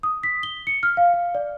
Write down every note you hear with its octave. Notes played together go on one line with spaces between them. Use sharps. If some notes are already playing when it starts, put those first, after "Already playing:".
D#6
B6
G7
C#7
F6
F5
F5
D5